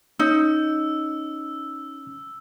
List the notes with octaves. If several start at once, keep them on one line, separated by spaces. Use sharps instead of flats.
C#4 D#4 E6